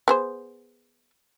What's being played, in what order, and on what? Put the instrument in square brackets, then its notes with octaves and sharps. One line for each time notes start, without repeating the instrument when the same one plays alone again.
[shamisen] B3 G#4 C5